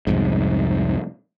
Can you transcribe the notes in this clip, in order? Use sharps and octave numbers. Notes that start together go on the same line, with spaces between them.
C2 F2 G#2